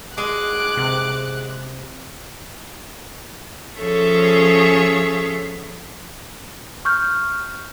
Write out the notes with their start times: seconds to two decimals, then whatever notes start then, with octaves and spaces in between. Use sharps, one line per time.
0.18 G#3 D6 F#6
0.77 C3
3.80 F3 C#4 G#4 A4 C#5 E5
6.85 C#6 F6 G6